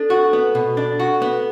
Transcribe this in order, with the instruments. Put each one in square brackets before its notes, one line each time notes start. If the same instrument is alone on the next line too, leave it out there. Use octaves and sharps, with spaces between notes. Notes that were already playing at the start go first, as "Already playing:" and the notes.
Already playing: [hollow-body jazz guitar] D4 [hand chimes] A4
[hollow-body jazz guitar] F#4
B3
B2
D4
F#4
B3